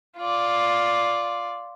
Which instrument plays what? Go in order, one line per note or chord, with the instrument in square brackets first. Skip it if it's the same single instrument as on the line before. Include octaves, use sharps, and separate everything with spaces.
[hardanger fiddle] F4 D5